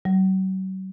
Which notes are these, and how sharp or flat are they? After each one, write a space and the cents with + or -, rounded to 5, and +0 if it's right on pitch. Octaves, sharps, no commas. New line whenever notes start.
F#3 +40